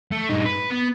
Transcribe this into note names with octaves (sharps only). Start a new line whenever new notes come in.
A3
G2 D#4
B4
B3